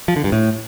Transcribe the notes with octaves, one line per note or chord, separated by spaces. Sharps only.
F3
D3
G2
A2